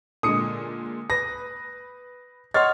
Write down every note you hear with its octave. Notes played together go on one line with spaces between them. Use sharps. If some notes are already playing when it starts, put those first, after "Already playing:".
A#2 D3 G#3 D#6 C#7
B4 A#6
C#5 D#5 F#5 C6 F6 A6